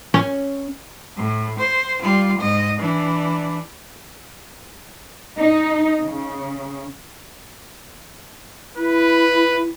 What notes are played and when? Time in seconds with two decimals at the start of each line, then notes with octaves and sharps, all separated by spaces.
0.14 C#4
1.16 A2
1.59 C5
2.02 G3 F4
2.38 G#2 D#5
2.79 E3 D4
5.39 D#4
6.03 C#3
8.77 E4 B4